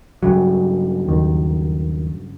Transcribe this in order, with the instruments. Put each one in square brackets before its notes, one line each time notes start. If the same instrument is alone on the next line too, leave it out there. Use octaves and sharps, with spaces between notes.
[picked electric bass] G2 C#3 F#3
[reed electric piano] D#2 D#3